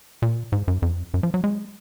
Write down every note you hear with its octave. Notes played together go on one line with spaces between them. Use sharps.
A#2
G#2
F#2
F2
F#2
F3
F#3
G#3